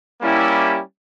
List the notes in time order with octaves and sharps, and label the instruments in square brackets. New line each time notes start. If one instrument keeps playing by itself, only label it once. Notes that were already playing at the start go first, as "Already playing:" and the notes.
[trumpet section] G3 A#3 C#4 E4 G4